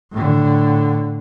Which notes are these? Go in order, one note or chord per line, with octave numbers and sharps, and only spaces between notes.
A2 D3